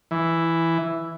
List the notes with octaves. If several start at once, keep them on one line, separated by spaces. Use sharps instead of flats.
E3